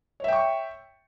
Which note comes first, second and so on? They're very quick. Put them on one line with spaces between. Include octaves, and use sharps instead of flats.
C#5 E5 G5 C#6